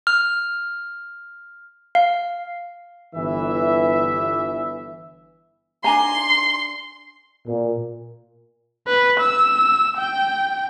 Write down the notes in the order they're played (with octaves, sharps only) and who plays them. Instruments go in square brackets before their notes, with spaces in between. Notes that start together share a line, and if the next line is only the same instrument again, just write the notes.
[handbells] F6
F5
[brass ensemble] G1 E3 E4 E5
[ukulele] D4 G#5 A#5 [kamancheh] C6
[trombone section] A#2
[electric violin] B4
E6
G5